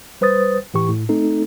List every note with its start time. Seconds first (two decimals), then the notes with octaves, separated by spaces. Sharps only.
0.21 G3 B4 C5 D#6 A6
0.74 A2 E3 G4 C#6
0.89 A2
1.09 A3 C4 D#4 A4